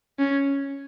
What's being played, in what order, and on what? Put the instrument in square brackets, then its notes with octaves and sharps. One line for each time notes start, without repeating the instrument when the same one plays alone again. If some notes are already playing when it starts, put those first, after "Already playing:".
[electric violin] C#4